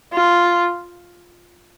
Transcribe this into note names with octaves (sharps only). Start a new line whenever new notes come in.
F4